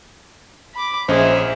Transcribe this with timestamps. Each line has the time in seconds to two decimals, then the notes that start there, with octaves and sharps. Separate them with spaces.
0.74 B5 D6
1.08 A#1 C#4 G#4 C5 D#5 E5